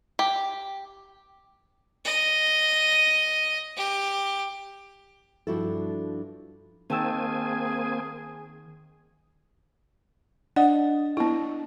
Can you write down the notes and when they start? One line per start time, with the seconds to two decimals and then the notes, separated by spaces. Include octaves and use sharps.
0.19 G4
2.05 D#5
3.77 G4
5.47 G2 F3 D4 E4 F#4 A4
6.90 D#3 A#3 C4 G#4 G#5 A5 E6
10.56 D4 D#5 F#5
11.17 B3 E4